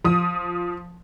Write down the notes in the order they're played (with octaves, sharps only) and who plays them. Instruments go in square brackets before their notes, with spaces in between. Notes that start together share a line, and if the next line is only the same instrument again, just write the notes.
[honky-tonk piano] F3 D#6